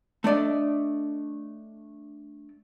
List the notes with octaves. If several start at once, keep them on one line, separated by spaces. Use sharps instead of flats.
A3 D4 D5 D#5